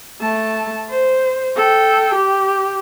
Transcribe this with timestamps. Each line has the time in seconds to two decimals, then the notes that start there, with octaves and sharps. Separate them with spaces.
0.22 A3 A5
0.90 C5
1.56 A4 G5
2.15 G4